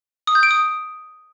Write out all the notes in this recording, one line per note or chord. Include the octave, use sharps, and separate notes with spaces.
D#6
G6
D7
D#6